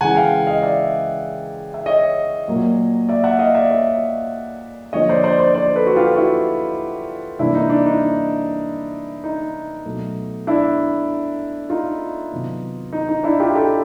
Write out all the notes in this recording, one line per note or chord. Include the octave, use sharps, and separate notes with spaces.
C#3 E3 G#3 F#5 G#5
F5 G5
D#5 F5
D5 E5
E5
C#5 D#5
A#2 F#3 A#3
D5 E5
E5 F#5
D#5 F5
D5 E5
C#5 D#5
D3 F3 A#3 C#5 D#5
C5 D5
C5 D5
C5 D5
C5 D5
A4 B4
F#4
F4 G4
E4 F#4
C3 E3 G3 A#3 D4 E4
D#4
D4
D#4
D#4
B2 F#3 A3
D4 E4
D#4 F4
C3 D#3 F#3 B3
D#4
D#4
D4 E4
F4 G4
G4 A4